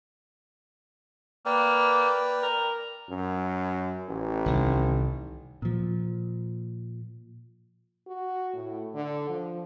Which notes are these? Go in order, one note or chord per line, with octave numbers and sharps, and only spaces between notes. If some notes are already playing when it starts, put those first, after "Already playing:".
A#3 B4 D5 G5
A#4
F#2
A1
C2 D#3
A#2 F3
F#4
A2
D3
F3